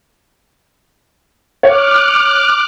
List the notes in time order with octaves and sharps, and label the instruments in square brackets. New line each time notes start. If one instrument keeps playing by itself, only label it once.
[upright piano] C#5 [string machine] D6 F6 F#6